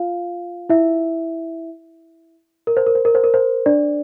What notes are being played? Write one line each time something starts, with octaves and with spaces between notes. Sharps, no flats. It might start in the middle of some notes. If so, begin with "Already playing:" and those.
Already playing: F4 F5
E4 E5
A#4
C5
A#4
C5
A#4
C5
A#4
C5
D4 D5